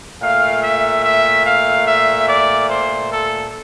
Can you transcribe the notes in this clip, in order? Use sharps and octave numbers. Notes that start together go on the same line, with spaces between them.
A#2 A3 F5
E5
E5
F5
E5
D5
C5
A4